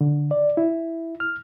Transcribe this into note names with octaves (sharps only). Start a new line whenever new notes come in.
D3
D5
E4
F6